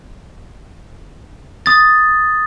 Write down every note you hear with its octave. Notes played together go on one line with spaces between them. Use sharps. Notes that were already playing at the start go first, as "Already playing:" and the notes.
D#6 A6